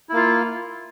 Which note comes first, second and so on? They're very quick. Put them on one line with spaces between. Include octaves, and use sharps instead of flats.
E4 A#3 F4